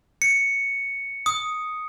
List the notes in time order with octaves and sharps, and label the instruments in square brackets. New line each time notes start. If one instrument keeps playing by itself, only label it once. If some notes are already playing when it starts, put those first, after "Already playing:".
[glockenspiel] C#7
D#6